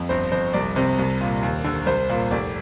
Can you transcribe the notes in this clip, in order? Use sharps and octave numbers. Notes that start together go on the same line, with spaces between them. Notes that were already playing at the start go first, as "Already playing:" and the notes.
Already playing: F2
G1 C5
F2 C5
C2 D5
C3 C5
C2
A#2
D#2
D3
C2 C5
A#2
F1 D5